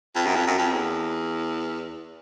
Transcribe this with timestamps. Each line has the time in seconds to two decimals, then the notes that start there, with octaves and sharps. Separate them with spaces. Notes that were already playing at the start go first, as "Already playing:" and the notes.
0.15 F2
0.26 F#2
0.36 F2
0.47 F#2
0.58 F2
0.72 E2